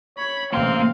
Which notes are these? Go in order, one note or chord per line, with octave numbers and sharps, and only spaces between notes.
C#5 B5
A1 C3 F#3 A#3 C4 F5 C6